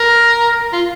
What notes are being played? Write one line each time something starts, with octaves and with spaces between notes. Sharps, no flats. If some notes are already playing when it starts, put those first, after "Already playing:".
Already playing: A#4
F4